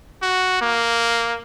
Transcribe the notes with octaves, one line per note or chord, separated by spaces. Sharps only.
F#4
A#3